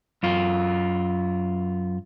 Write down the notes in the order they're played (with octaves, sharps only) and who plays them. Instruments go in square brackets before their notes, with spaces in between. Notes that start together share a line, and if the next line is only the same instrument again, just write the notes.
[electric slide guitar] F#2 F4